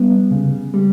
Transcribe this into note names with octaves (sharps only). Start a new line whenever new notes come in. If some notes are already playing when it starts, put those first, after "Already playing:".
Already playing: G3 B3
C#3
G3